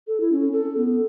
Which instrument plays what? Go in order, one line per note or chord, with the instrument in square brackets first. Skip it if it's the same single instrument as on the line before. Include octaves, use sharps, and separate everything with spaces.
[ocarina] A4
E4
C#4
A4
B3